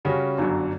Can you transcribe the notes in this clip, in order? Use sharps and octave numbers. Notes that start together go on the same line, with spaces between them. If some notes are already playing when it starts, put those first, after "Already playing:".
C#3 G3 C#4 F#4
G1 F#2 D3 F#3